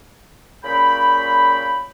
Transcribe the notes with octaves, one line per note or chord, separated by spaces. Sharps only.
A#2 C#3 C#5 G5 B5